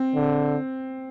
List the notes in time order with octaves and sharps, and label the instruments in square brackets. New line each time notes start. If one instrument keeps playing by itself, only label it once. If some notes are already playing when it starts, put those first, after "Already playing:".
Already playing: [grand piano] C4
[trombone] D3